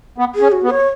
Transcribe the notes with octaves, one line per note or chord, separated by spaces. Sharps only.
B3
G#4
C#4
F#4
B3
C#5